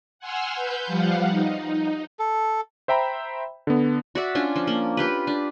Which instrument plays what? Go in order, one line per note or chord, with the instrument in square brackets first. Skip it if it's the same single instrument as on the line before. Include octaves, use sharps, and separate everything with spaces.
[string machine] F#5 G#5 C6 E6 F6
B4 G6
F3 G3 F5 F#5
D#4
D#4
[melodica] A4
[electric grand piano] C5 E5 G5 A#5 B5
D3 B3
[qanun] F#4 D5 E5
C#4 D4 F4
F3
A#3
F4 G4 B4
D4